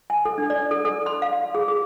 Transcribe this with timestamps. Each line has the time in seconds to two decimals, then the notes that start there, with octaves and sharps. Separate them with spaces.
0.10 G#5
0.25 A4
0.38 D4
0.50 D5
0.71 A4
0.85 A4
1.06 C6
1.22 F5
1.55 G#4
1.68 G#4